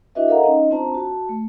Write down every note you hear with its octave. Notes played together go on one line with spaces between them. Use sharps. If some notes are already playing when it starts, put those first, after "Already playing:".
D4 E4 F#4 B4 D#5 E5
A4 A#4 D#5 F5 F#5 A#5
C#4 D#4 D#5
C4 D4 F4 C5 A5 A#5
F#4 A5
A3